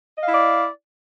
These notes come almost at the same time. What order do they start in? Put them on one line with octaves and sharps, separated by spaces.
D#5 F5 E4 D5